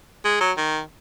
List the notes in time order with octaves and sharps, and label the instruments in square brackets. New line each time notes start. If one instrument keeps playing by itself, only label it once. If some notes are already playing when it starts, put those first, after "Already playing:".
[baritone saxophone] G#3
F#3
D#3